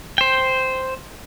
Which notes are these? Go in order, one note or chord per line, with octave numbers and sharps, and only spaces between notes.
C5 G5